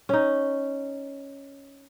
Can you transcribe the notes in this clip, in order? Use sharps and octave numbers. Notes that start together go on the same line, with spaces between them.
C#4 D#4